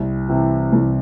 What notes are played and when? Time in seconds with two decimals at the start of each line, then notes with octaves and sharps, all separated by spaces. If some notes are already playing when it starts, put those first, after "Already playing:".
Already playing: C2
0.28 C3 E3
0.73 C2